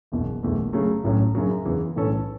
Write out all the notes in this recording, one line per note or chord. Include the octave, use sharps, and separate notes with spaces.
F#1 E2 B2
F#1 E2 B2 A3
C#3 F#3 A3
A1 A2 F#3 C#4
F#2 C#3 F#3
E2 C#3 E3
B1 A2 E3 C#4 A4